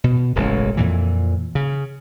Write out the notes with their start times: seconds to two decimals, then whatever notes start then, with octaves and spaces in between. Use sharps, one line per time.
0.04 B2
0.35 E1 A1 C#3 G#3
0.77 F2 A#2 E3
1.55 C#3